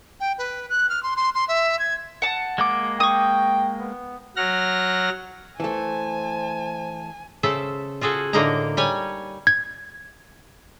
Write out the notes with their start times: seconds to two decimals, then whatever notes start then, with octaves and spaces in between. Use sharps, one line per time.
0.20 G5
0.38 B4
0.70 F#6
0.89 F6
1.03 C6
1.17 C6
1.35 C6
1.48 E5
1.79 G#6
2.22 F#5 A5
2.58 G#3 A#3 D6
3.00 G5 C#6 D#6
3.80 B3
4.36 F#3 F#5 F6 A#6
5.60 E3 A3 C5 G#5 A5
7.43 C#3 A4 C5 E5
8.01 F4 F#4 G#4 A4
8.33 A2 D3 A#3 D#4 D#5 A#5
8.77 G3 C#5 G#5
9.47 G#6